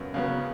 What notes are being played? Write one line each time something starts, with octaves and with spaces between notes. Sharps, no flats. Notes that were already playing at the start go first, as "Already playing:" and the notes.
Already playing: F#2 C#3 B3
C#3 F#3 B3